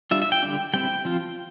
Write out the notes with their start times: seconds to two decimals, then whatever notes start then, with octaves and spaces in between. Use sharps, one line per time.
0.11 G3 D4 F4 E5
0.22 E5
0.32 G5
0.43 D3 G3 D4
0.73 G3 C4 E4 G5
1.05 F3 C4 F4